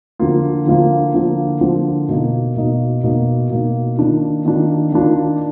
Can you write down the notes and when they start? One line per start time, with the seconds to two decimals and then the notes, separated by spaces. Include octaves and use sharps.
0.19 D3 F3 A#3 F4
0.66 D3 F3 A#3 F4
1.14 D3 F3 A#3 F4
1.61 D3 F3 A#3 F4
2.08 B2 A#3 D#4
2.56 B2 A#3 D#4
3.03 B2 A#3 D#4
3.50 B2 A#3 D#4
3.97 D#3 A#3 D4 F4
4.45 D#3 A#3 D4 F4
4.92 D#3 A#3 D4 F4